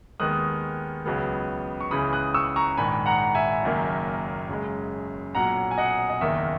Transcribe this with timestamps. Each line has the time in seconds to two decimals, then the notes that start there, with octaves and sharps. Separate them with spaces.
0.20 D#2 D#3 G#3 B3 D#6 F#6
1.06 C#2 C#3 F#3 B3
1.81 C#6
1.91 C#2 C#3 E3 B5 D#6
2.13 D#6 F#6
2.34 C#6 E6
2.56 A#5 C#6
2.77 A#1 G#2 D#3 G#5 B5
3.06 F#5 A#5
3.35 E5 G#5
3.63 F#1 F#2 D#3 A#3
4.49 F#2 C#3 G#3
5.35 B1 A#2 F#3 F#5 A#5
5.71 G#5
5.78 D#5 F#5
6.10 D#5
6.21 F#1 E2 D#3 A#3 E5